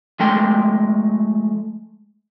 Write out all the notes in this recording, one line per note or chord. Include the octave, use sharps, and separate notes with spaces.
F3 G#3 A3 A#4 G5 C6